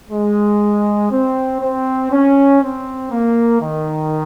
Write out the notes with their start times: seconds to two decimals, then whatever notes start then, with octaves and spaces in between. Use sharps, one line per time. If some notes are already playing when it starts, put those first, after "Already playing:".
0.10 G#3
1.11 C4
1.61 C4
2.11 C#4
2.61 C4
3.11 A#3
3.61 D#3